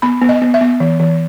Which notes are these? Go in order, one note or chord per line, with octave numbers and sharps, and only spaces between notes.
B3 B5
B3
D#5
B3
E5
B3
E3
E3